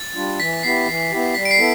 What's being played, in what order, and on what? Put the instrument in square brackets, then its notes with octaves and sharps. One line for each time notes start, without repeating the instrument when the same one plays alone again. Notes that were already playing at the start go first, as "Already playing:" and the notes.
Already playing: [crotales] A6
[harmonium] G3 D4 F4
[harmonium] E3 [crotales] B6
[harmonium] B3 E4 G4 [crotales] C7
[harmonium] E3
B3 E4 G4
[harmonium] G3 [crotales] B6
[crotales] D7
C7
[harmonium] B3 E4 A4